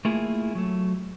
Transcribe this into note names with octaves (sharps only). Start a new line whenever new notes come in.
A3 A#3 E4 F4 G#4
F#3 A3